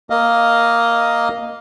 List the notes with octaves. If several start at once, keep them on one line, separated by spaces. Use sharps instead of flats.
A#3 D#5 F5